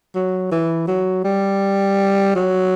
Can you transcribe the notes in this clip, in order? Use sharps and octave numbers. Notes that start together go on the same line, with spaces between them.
F#3
E3
F#3
G3
F#3